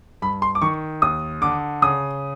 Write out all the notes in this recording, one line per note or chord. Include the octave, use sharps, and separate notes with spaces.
G2 B5
C6
D6
D#3 C#6
D#2 D#6
D3 D6
C#3 D#6